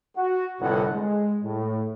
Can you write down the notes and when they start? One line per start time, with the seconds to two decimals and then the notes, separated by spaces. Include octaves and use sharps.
0.16 F#4
0.60 G1 C2 A2 F#5
0.94 G#3
1.43 A2